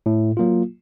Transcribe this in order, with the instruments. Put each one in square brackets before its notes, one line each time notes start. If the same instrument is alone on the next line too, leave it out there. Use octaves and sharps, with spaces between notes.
[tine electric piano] A2
F#3 A#3 F4